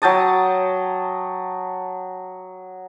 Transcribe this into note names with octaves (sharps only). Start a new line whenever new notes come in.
F#3 G5 A5 D#6